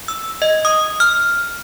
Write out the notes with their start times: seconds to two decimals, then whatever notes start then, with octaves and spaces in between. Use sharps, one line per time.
0.08 E6
0.42 D#5
0.65 D#6
1.00 F6